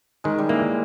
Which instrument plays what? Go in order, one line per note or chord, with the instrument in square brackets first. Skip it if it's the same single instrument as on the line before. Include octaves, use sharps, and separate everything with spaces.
[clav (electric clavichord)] D#3 [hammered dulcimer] G#3
[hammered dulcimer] G3
[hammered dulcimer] E3 [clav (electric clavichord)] A#3